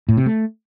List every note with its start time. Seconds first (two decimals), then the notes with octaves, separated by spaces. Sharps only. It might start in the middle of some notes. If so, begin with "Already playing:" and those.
0.09 A2
0.17 C3
0.26 A3